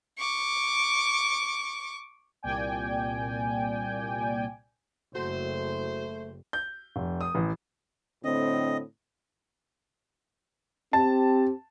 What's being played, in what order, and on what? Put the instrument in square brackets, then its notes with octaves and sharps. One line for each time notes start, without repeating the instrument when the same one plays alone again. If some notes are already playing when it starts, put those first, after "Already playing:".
[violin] C#6 D6
[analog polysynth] C2 A#2 D5 G5 G#5
[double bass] F#1 [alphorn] A3 [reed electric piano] F#4 A4 [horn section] C5
[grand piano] G6
F1
D#6
A1
[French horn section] A2 D3 C4 [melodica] D#5
[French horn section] C4 G4 [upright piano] A5